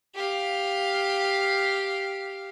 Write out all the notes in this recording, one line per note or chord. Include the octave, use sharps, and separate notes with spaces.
G4 F5